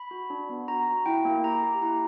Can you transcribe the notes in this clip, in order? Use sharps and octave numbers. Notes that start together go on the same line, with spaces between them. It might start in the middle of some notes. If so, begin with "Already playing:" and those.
Already playing: B5
F#4
D4
B3
F#4 A#5
F#4
E4 G5
A#3
G4 A#5
G4
E4 A#5